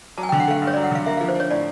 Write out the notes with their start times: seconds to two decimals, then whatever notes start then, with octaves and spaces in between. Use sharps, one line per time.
0.18 F#3 A5
0.23 G#5
0.29 G5
0.32 D3
0.40 F#5
0.47 A3 F5
0.62 G2
0.67 C#5
0.73 D5
0.77 F#3
0.84 F#5
0.91 D3 F5
1.06 A#3 E5
1.17 F5
1.21 F3
1.29 C5
1.36 D4 C#5
1.50 A2 D5